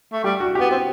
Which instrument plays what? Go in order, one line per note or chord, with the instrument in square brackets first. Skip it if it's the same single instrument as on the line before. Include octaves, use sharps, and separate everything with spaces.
[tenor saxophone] A3
[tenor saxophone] G3 [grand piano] G4
[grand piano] F#4
G4
[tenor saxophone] B3
C4